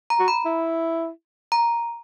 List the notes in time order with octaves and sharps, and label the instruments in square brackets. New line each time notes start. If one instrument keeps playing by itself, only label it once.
[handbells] A#5
[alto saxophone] F#4
[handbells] B5
[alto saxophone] E4
[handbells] A#5